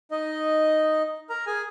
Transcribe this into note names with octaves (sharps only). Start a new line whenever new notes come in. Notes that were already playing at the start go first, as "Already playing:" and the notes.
D#4 D#5
A#4 A#5
G#4 G#5